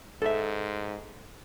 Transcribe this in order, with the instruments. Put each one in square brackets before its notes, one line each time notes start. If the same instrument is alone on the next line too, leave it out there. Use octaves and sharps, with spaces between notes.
[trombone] G#2 [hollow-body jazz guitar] A4 E5